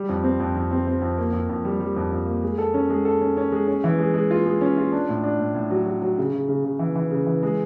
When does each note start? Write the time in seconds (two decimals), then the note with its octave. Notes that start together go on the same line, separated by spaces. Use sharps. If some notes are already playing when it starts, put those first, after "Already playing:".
Already playing: G3
0.09 F2
0.24 C4
0.40 F2
0.56 F2
0.71 C4
0.87 C4
1.02 F2
1.18 A#3
1.33 F2
1.49 F2
1.65 G3
1.80 G3
1.96 F2
2.12 F2
2.27 A#3
2.43 G#3
2.58 A4
2.74 C#4
2.90 G#3
3.05 A4
3.21 C#4
3.37 C#4
3.52 G#3
3.67 C#4
3.84 E3
3.98 G#3
4.14 G#3
4.31 F4
4.46 G#3
4.61 C#4
4.77 F4
4.92 D4
5.09 A2
5.24 D4
5.39 A2
5.55 A2
5.70 F#3
5.86 F#3
6.02 F#3
6.18 C#3
6.33 C#3
6.48 C#3
6.64 C#3
6.79 E3
6.95 E3
7.11 C#3
7.26 E3
7.43 G#3